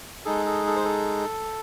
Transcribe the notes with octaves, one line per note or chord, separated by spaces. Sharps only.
G#3 D#4 G#4 A4
A4
A4
C5
A4